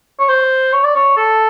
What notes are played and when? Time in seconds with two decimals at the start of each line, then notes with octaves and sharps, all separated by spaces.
0.19 C#5
0.29 C5
0.73 C#5
0.84 D5
0.95 C#5
1.17 A4